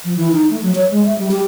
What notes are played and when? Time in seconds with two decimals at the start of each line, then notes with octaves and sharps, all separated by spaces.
0.05 F3
0.17 E3
0.33 D#4
0.50 A3
0.62 F#3
0.75 C#5
0.91 G#3
1.06 E5
1.19 G3
1.31 G4